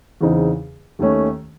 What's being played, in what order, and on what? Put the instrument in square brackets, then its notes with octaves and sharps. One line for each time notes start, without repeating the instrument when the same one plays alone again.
[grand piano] E2 C#3 E3 C4 D#4
D#2 D#3 A3 C#4